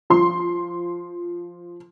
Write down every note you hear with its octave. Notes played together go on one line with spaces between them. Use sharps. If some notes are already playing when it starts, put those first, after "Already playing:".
F3 C6